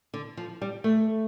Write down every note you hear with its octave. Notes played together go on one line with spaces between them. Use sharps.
D3
F3
G3
A3